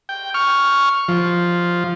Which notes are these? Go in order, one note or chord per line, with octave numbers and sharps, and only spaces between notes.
G5
C#6 F6
F3